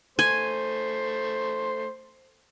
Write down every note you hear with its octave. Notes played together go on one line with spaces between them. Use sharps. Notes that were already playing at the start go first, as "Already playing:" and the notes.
A3 C5 G#5